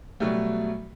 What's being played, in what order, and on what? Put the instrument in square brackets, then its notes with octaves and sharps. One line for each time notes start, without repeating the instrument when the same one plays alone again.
[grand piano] B2 F#3 G3 A3